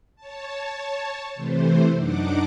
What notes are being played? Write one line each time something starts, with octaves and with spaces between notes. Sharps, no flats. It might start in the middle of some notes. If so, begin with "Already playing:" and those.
C#5 A5
C3 E3 A3 C5
F#2 D4 D#4 F#5 D6